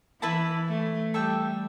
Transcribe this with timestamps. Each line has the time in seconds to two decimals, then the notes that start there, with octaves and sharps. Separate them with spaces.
0.22 E3 E4 B4 E5 A5
0.69 A3
1.14 G3 A4 E5 G5